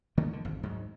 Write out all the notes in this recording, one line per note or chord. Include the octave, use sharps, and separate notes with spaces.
D3 D#3 A3 A#3
D3
G#1 F2
D2 G#2 F#3